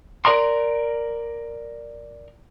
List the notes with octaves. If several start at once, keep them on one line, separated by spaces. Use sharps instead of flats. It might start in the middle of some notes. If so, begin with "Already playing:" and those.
A#4 D5 A#5 C6